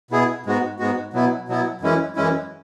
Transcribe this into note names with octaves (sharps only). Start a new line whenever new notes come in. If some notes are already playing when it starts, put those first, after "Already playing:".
B2 B3 E4 G#4
G#2 G#3 B3 F#4
G#2 G#3 B3 F#4
B2 F#3 B3 E4
B2 F#3 B3 E4
F#2 E3 G#3 C#4 E4
F#2 E3 G#3 C#4 E4